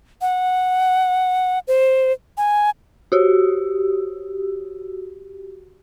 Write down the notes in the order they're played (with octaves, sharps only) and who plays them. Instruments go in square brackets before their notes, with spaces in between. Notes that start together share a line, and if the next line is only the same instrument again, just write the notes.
[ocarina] F#5
C5
G#5
[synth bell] F#4 G4